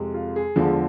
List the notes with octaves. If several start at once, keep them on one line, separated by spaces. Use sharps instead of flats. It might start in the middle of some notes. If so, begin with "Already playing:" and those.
Already playing: F2 C3 G#3
F4
G#4
E2 D3 F3 G#3 A4